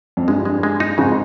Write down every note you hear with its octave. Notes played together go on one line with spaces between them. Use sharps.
F2
G2 G#3
G#3
G#3
D#4
F2 G#2 C#3